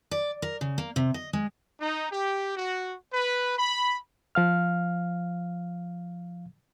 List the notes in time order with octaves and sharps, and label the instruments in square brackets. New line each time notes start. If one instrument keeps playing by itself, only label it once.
[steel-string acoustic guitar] D5
A#4
C#3
A#3
C3
D#5
G#3
[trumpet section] D#4
G4
F#4
B4
B5
[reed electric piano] F3 F5 F6